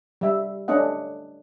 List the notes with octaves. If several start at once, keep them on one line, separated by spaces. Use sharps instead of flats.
G3 E5
A3 C#4 D4 D#5 F#5